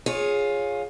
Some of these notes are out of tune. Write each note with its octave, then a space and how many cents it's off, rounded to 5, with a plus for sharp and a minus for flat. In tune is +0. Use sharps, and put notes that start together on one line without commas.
F4 +15 G#4 +0 C#5 +0